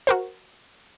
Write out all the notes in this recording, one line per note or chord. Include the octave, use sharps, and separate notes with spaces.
F#4 A#4 C5